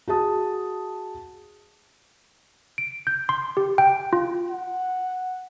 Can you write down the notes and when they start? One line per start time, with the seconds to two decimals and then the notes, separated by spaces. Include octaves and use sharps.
0.08 F#4 G#4 A5 D#6
2.78 D7
3.07 G6
3.29 C6
3.57 G4
3.78 G5
4.13 F4
4.50 F#5